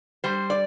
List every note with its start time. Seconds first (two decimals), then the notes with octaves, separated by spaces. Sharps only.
0.24 G3 C5
0.50 D5